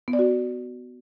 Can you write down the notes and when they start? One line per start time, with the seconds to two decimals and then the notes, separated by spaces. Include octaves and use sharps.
0.08 B3
0.13 D5
0.19 F#4